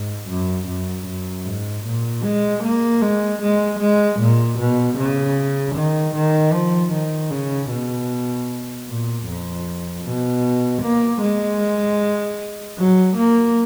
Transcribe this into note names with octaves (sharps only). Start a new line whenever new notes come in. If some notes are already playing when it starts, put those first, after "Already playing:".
Already playing: G#2
F#2
F#2
F#2
G#2
A#2
G#3
A#3
G#3
G#3
G#3
A#2
B2
C#3
D#3
D#3
F3
D#3
C#3
B2
A#2
F2
B2
A#3
G#3
F#3
A#3